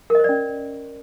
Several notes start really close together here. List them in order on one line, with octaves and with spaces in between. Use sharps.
A#4 D#5 C5 D5 C#4